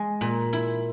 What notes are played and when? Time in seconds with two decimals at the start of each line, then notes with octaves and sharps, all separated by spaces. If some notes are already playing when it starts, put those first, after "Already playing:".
Already playing: G#3
0.21 A#2
0.53 E4